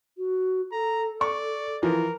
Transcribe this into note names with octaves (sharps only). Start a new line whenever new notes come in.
F#4
A4 A#5
D5 C#6
E3 F3 A#4